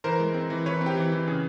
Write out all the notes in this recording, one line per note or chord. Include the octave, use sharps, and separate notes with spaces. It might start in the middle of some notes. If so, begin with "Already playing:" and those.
E3 A#4 C5
G#3
C4
E3
E3 B4 C#5
C4
G4
E3
E3
C#3 G#4